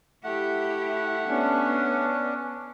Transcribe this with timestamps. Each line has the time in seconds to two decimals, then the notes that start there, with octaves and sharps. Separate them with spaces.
0.24 A3 E4 G4 F#5
1.28 B3 C#4 D4